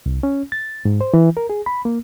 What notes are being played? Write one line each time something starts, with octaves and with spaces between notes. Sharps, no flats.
C2
C#4
A6
G#2
C5
E3
A#4
G#4
B5
A#3